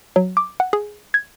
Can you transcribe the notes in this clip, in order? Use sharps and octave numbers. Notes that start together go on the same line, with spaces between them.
F#3
D6
F#5
G#4
G#6